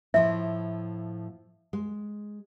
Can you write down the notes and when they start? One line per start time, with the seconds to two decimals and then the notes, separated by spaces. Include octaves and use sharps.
0.14 A2 F3 E4 E5
1.73 G#3